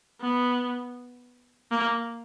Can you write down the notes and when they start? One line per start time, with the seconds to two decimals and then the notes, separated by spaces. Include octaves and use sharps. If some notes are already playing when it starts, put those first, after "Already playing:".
0.21 B3
1.71 A#3